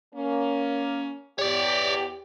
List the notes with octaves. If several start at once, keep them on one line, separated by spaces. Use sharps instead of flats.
A#3 C#4
E2 G4 C#5 D5